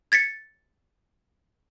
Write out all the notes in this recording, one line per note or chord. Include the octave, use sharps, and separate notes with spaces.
G#6 A6 B6 C#7